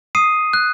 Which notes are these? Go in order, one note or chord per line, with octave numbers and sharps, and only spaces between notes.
D#6 C7 D#7
F#6